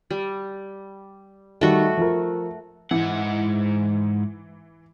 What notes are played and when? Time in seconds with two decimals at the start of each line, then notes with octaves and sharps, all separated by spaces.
0.11 G3
1.61 D#3 G3 A3 F#4
1.97 F3 A#4
2.91 G#2 E3 F#5